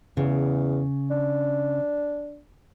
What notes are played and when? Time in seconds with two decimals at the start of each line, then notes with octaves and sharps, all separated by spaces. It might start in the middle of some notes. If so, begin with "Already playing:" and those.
0.17 E2 C#3
1.11 D4